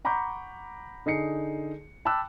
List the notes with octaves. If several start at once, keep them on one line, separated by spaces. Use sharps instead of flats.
F#5 A#5 B5 C#6 D6 G6
D3 D#4 G#4 C7 C#7
G5 A5 B5 D6 E6 F#6